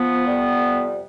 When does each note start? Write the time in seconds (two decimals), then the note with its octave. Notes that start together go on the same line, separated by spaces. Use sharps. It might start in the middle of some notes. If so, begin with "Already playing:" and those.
Already playing: F3 B3
0.25 F2 C3 G3